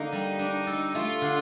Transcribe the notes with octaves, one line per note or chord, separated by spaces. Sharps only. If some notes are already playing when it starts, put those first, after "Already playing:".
Already playing: D3 A#3 D#4
G3
D4
A4
A3 F4
D3